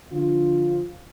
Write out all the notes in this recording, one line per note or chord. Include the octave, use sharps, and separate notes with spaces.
D3 F3 F4